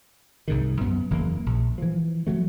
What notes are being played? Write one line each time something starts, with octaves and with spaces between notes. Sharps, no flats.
C2 G#2 D#3
F#2 B3
F#1 E2 E3 A#3
A#1
E3 F3
F3 F#3 A3